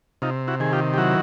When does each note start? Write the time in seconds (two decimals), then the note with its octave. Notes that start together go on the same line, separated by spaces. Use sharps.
0.22 C3 D#4 F4
0.48 E4 F#4
0.60 D#3 G#4
0.73 F4 G4
0.94 G4
0.98 F#3 E4 F#4